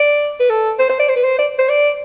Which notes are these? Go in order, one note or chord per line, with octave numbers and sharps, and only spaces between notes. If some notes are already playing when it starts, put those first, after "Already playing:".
Already playing: D5
B4
A4
C5
C5
D5
C5
B4
C5
D5
C5
D5